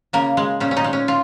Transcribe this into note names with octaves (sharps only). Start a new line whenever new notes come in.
C#3 A#3
G#3
A#2 C#4
C#4
D#4
G#3
C#4
F4